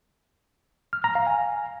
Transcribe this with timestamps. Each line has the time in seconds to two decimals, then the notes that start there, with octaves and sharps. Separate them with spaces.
0.93 F6
1.04 A#5
1.15 F5
1.27 G#5